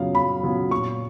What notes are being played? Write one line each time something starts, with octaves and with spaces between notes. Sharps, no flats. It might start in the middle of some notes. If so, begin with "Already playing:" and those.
Already playing: F#2 C#3 F#3 B3 F4 F5
F#2 B5
C#3 F#3 B3 F4
A#2 C#6